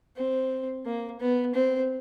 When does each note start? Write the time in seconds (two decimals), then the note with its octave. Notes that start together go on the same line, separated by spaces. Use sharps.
0.17 C4
0.85 A#3
1.20 B3
1.54 C4